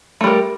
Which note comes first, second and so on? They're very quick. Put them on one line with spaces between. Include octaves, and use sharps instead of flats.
A3 G3 A#4